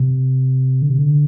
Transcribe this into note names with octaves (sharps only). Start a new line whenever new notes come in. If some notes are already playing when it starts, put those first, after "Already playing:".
Already playing: C3
D3
C3
D3